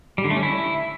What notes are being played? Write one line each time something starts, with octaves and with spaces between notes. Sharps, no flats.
G3
D3
A3
C#4
E4